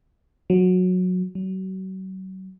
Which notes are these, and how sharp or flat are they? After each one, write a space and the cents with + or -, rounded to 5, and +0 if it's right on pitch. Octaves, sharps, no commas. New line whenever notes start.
F#3 -20
F#3 +35